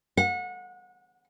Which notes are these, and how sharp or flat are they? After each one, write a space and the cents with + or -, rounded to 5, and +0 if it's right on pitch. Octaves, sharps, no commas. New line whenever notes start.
F#5 -30